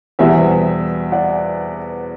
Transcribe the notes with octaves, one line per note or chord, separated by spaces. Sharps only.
E2 B2 G3 C5 E5
D5 F#5